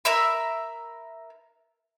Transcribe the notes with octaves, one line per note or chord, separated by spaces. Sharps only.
A#4 E5 B5